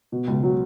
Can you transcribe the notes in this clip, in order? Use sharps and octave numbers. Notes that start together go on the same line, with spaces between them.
B2
C#2
F#3